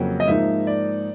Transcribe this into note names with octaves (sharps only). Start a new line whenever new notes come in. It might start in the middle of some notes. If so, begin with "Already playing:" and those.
Already playing: F2 C#3 F#3 A#3
D#5
G#2 F3 A#3 D#4 E5
D5